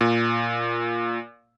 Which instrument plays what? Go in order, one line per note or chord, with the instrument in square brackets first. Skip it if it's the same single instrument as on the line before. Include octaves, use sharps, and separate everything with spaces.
[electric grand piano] A#2